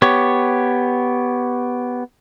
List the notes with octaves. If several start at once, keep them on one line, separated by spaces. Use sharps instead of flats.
B3 G4 C#5